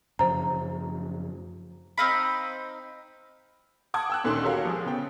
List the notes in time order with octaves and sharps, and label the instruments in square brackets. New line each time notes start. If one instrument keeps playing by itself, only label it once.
[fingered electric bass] F#2 C#3 F3 [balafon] C5 A#5
[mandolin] C4 D#4 F5 B5
[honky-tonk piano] F#5 A5 D6 D#6 G#6
G5 E6 F#6
D2 A#2 D#3 C#4 C6
F#4 G4 A4 A#4 C#5 F5
F3 G#3 G#4
C#3 B3 G5